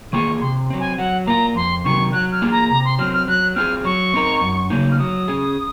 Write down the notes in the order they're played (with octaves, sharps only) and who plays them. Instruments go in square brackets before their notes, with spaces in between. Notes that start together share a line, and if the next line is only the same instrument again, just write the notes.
[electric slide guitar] D#3 A#3 F4 G#4 [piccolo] C#6
[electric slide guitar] C3 [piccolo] C6
[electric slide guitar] F#3 C4
[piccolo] G#5
[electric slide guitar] F#3 [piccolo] F#5
[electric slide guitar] A#3 F4 [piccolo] A#5
[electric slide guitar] F2 [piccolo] C6
[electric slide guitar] C3 D#3 F#3 [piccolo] C#6
[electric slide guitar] F#3 [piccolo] F#6
[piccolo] F6
[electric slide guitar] A#3 F4 G#4
[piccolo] A#5
[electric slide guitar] C3 [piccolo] A#5
[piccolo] C6
[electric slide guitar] F#3 C4 [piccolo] F6
[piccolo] F6
[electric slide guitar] F#3 [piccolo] F#6
[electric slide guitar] C4 F4 G#4 [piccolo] F6
[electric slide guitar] F#3 [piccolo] C#6
[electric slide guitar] C4 D#4 A#4
F#2
C#3 F#3 A#3 D#4
[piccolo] F6
[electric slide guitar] F#3 [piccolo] D#6
[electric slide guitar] C#4 G#4